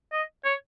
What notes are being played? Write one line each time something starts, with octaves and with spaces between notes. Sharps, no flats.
D#5
C#5